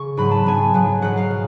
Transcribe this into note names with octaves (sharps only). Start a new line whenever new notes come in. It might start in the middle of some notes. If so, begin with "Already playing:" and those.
Already playing: C#3 C#6
G#2 F#3 B3 B5
A5
G#2 F#3 B3 G#5
G#2 F#3 B3
G#2 F#3 B3 F#5
F5
B2